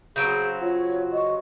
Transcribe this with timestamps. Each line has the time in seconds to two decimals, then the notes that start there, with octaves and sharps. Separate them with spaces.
0.16 C#3 F#3 C4 G#4 G6 D7
0.61 F4 C#5 F#5
1.12 D#5 C#6